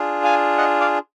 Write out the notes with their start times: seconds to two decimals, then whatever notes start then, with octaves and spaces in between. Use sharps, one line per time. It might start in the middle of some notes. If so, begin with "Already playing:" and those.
Already playing: D4 F4 G#4
0.24 F5 G#5
0.58 D#5 F#5
0.80 D5 F5